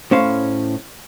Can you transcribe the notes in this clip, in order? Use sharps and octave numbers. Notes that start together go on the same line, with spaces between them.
A2 C#4 C5 F5